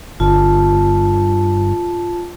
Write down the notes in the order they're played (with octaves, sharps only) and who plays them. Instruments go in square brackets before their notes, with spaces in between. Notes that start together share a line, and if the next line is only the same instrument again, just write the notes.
[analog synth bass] G1 [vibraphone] F4 A5